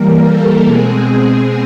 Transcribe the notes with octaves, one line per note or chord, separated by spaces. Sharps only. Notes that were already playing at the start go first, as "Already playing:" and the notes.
Already playing: E3 G3 A#3 A#4
A4
B2 G#3 C4 G#4